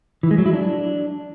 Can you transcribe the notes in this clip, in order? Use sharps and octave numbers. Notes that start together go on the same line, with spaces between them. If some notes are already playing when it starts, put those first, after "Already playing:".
E3
G#3
F#3
E4
D4